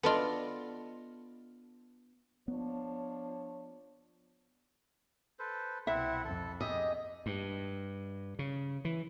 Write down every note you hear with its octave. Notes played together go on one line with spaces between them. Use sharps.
B3 D4 F4 A4 D#5
F3 B3 D4 C#5
A4 B4 C5
C2 B2 C4 E4 E5 F#5
F2 A4
G4 G#4 D#5 E5
G2
C#3
E3